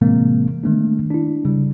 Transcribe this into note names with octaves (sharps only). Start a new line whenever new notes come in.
A2 C3 E3 G#3 A#3 C4
D#3 G#3 A3 B3 D4
D4 E4
C#3 G3